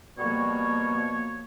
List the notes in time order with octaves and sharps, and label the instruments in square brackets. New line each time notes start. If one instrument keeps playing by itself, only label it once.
[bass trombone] B2 [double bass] F3 A#3 [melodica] G3 F#4 [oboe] C#5